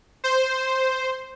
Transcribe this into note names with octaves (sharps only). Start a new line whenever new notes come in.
C5